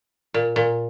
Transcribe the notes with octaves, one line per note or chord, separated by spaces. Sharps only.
A#2
A#2